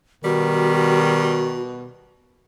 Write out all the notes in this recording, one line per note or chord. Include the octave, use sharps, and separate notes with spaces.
B2 D#3 G3 F#4